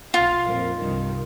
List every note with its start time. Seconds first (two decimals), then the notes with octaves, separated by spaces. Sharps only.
0.14 B1 F4 F5
0.45 A#1 F2 A#4
0.79 C2 G2 D#3